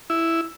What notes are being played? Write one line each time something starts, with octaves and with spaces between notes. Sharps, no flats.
E4